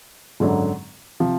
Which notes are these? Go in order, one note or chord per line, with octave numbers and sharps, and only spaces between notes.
G#1 F#2 D3 F#3
C3 F3